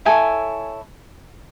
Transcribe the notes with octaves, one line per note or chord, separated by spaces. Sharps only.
E4 A4 C#5 G#5